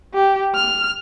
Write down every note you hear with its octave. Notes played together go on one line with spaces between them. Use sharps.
G4
F6